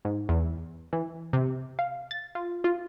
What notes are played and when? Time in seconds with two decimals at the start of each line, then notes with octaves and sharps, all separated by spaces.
0.05 G#2
0.29 E2
0.93 E3
1.33 C3
1.79 F5
2.11 A6
2.35 F4
2.64 F4